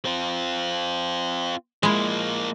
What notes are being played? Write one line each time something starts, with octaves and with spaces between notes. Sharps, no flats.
C4 F4
F3 G#3 A#3 E4